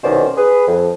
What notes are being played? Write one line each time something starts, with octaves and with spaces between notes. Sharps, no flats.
C2 B2 D#3 C#4 C5 D5
G#4 B4
F2